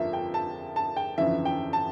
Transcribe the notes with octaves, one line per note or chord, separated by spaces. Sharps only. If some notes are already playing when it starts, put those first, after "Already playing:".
Already playing: G1 F2 D3 F3 A#3 E5
G5
A5
A5
G5
G1 F2 C#3 E3 E5
G5
A5